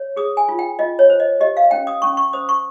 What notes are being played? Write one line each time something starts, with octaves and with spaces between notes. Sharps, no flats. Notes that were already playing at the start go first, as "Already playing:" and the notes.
Already playing: C#5
G#4 D#6
G#5
F4
G5
F4 D#5
C#5
C5
D#5
G4 D#5
F5
C#4 G5
D#6
C#4 C#6
C#6
C5 D#6
C#6